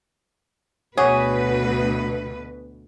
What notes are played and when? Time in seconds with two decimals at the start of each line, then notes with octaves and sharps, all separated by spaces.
0.98 D2 B2 F#4 G#4 B4 C#5 F#5 D6